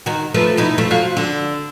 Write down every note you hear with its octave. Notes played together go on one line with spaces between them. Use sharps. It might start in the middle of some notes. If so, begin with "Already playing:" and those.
D#3 F#4
F3 A3 B4
B2 D#4 E4
F3 A3
F3 F#4 F5
D3